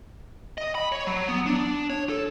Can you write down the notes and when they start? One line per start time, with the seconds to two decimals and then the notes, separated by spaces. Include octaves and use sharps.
0.58 D#5
0.75 B5
0.92 C#5
1.07 F#3
1.28 B3
1.46 D4
1.90 C#5
2.09 A4